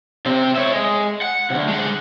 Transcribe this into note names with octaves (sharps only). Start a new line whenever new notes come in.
C3 C4
C#5 E5
G#3
F#5
D2 C3
G#3 F#5